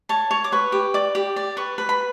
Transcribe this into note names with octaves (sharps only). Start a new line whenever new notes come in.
C#5 A5
C#5
D6
B4 C#6
G4
D5 D6
G4
D5
B4 C#6
B4
B5